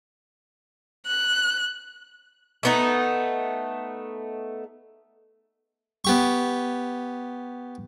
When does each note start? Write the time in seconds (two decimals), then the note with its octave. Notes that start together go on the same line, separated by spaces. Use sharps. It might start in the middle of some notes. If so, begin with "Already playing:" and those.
1.06 F#6
2.63 A3 B3 D#4
6.05 B3 G4 C#6